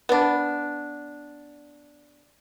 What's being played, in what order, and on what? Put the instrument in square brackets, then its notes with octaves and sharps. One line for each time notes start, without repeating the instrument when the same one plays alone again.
[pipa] B3 D4